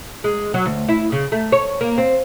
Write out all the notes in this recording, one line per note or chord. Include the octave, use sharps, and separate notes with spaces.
G#3
F#3
D2
E4
C#3
A3
C#5
A#3
C4